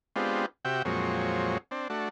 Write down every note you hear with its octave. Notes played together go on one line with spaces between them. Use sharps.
G#3 B3 C4 D4 F4 G4
C3 F#4 G4 E5 G5
F2 A#2 F#3 G#3 C4 C#5
C4 D4
A3 D4 F#4